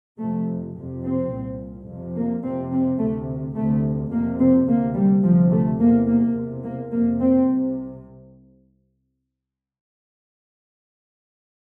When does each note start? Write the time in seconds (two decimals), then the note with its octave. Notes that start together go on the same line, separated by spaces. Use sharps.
0.19 F2 C3 A3
0.76 F2 C3
1.04 C4
1.31 C2 A#2
1.88 F2 C3
2.15 A#3
2.44 F2 C3 C4
2.71 C4
2.99 D2 C3 A3
3.55 D2 C3 A3
4.11 F2 C3 A#3
4.39 C4
4.67 D2 C3 A#3
4.95 G3
5.23 D2 C3 F3
5.51 A3
5.80 E2 C3 A#3
6.07 A#3
6.35 E2 C3
6.63 A#3
6.91 F2 C3 A#3
7.20 C4
7.48 C2 C3